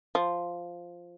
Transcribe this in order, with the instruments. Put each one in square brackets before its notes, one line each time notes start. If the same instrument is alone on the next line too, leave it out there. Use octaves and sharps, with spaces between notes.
[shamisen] F3